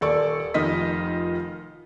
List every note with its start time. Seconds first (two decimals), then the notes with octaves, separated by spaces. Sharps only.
0.01 D#1 A4 D5 C#6
0.54 F1 D#3 F3 F4 D#5 B6